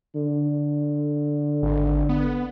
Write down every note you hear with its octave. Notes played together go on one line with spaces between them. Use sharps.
D3
G#1
B3